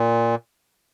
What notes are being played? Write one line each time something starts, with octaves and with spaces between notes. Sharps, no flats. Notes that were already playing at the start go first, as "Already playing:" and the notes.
Already playing: A#2